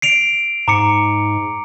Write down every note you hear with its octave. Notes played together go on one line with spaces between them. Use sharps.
C7 D7 F7
G#2 A#5 D6 C#7